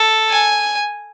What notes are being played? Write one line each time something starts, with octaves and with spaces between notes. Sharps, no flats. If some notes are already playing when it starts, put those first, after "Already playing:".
Already playing: A4
G#5